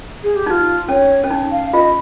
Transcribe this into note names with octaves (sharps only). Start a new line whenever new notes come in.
G#4
G4
D#4 F4 G4
C#4 C#5
C#4
D#4
F5
F4 D#5